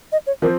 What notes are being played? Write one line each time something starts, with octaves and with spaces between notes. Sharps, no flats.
D#5
C#5
F3 C4 A#4